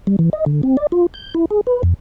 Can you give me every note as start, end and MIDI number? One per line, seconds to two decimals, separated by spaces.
0.07 0.16 55
0.19 0.30 52
0.33 0.45 75
0.46 0.61 50
0.63 0.77 60
0.77 0.87 74
0.92 1.06 65
1.14 1.34 91
1.35 1.45 64
1.51 1.61 68
1.67 1.82 71
1.83 1.94 41